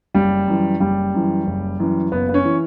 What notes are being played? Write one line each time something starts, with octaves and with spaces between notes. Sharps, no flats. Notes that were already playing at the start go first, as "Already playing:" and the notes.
F#1 G3
F#2 E3
F#1 G3
F#2 E3
F#1
F#2 E3
F#1 B3
B3
C#4
E3